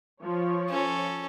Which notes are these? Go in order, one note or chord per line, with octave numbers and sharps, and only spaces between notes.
F3 C#5
C#4 A4